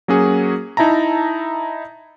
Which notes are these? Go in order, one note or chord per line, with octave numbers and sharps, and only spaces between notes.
F#3 A#3 C#4 F#4 G#4
D#4 E4 E5 A5 A#5